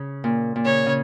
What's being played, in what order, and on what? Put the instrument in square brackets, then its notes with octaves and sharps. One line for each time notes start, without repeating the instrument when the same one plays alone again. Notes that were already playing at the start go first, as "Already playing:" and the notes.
Already playing: [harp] C#3
A#2
A#2
[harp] C#3 [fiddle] C#5
[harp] C#3